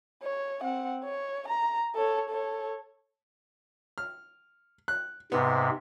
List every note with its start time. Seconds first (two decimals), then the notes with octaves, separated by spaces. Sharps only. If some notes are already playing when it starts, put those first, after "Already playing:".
0.23 C#5
0.62 C4 F#5
1.04 C#5
1.48 A#5
1.95 A4 C#5
2.29 A4 C#5
3.98 F6
4.88 F#6
5.32 G#2 C3 B3